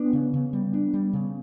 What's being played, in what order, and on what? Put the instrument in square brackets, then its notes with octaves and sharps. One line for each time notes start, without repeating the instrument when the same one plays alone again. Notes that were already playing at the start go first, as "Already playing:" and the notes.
Already playing: [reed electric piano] B3 [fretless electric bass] D4
[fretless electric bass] C#3
C#3
G3
D4
G3
C#3